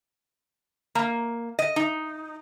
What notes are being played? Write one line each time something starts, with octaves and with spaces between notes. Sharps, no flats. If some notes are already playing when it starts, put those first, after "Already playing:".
A#3
D#5
D#4